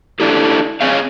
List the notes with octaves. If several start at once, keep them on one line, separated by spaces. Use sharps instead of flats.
D4 E4 G4 A4
C4 G#4 C#5 D#5 F5